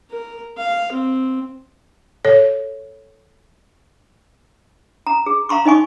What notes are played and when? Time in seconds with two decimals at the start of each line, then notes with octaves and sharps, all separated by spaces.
0.10 A#4
0.57 F5
0.92 C4
2.25 A4 C#5
5.07 A#5
5.26 G#4
5.49 F5 A#5 C6 C#6
5.65 D#4 D#5 G#5 C#6